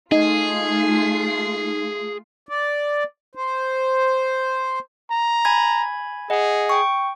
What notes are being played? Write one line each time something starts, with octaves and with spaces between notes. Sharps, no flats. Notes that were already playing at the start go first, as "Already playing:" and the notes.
A3 D#4 F4 G#4 C7
D5
C5
A#5
G#5 B5 G#6
G#4 D#5 F#5
G5 C#6